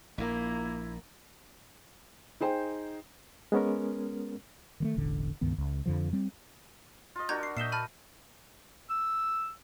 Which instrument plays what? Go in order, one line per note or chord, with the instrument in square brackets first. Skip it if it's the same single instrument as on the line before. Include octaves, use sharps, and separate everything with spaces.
[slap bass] A#1 A#2 [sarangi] A#3 [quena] E4
[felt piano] D#4 G#4 C5 G5
[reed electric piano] G#3 B3 C#4 A#4
[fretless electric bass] D#3 G#3 A3
E1 A1 D3
C#2 G2 D#3 B3
C#2
F2 D3 F3
G3 C4
[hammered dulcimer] F4 D#5
[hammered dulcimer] D4 F#4 A#4 [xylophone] A#5 G6 G#6
[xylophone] C7
[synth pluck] A#2 G6 [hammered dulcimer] D#5 E5 [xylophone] C7 E7 G7
[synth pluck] A5 D#7 [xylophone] B5 F6
[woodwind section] E6